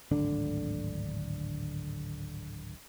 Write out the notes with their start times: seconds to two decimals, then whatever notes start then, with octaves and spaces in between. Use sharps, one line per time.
0.11 D1 G#1 D3 D4